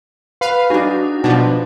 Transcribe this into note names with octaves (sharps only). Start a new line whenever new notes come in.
B4 F5
D4 D#4 F#4 G#4
B2 F3 D4